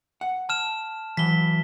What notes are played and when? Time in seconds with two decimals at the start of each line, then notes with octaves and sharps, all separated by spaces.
0.21 F#5
0.49 A5 F6 E7
1.17 E3 F#3 B6 G7